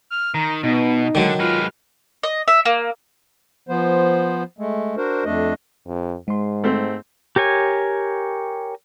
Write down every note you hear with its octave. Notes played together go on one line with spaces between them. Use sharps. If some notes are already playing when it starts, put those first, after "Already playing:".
F6
D#3 A#5
B2 B3 D#4
D3 D#3 F#3 G#3
G#3 F4 B4 F6
D#5
E5
A#3
F3 B3 C5
G#3 A3
D4 F#4 A#4 C5
F2 A3 D4 D#5
F2
G#2 G#3 C6
A3 C4
G4 A#4 C#5 G#5